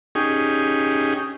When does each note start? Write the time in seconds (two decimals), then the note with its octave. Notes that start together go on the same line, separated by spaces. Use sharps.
0.15 C#4 D#4 G4 G#4